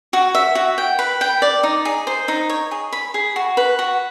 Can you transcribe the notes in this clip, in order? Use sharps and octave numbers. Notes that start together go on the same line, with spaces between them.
F#4
E5
F#4
G5
B4
G5
D5
D#4
G#4
C5
D#4
C#5
G#4
B5
G#4
F#4
B4
F#4